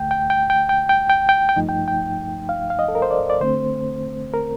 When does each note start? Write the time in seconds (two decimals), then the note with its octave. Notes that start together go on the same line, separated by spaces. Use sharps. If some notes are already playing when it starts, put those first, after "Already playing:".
Already playing: D2 D3 A3 G5
0.11 G5
0.30 G5
0.50 G5
0.69 G5
0.89 G5
1.10 G5
1.29 G5
1.49 G5
1.56 G2 F3 A3 D#4
1.69 G5
1.88 G5
2.49 F5
2.70 F5
2.79 D#5
2.88 A4
2.95 A#4
3.02 C5
3.11 D5
3.30 D5
3.41 D3 A3 C4 C5
4.34 A#4